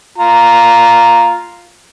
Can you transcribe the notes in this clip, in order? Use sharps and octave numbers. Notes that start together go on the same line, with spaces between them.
F4 A#5